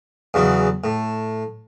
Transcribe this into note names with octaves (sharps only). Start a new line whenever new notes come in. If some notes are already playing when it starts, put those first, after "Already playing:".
E2 C#3 F#3
A2